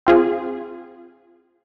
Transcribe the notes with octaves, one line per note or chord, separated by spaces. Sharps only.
C4 F4 G#4